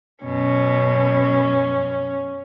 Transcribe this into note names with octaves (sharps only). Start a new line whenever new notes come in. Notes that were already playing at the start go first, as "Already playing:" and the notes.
F#2 B2 C#4